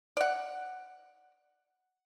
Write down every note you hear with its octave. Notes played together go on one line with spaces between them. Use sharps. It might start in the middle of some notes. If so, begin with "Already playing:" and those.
D5 F#5